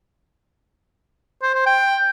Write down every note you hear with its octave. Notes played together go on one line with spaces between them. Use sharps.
C5
C5
G5